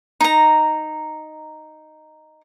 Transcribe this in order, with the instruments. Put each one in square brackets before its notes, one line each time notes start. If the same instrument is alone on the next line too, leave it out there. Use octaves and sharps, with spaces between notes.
[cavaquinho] D#4 A#5